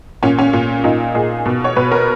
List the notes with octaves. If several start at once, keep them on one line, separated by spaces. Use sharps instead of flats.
A#2 C#4
C#4
A#2
A#2 D#4
A#2 G#4
B2
C#5
B2 B4
A#4